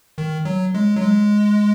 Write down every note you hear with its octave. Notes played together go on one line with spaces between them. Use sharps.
D#3
F#3
G#3
F#3
G#3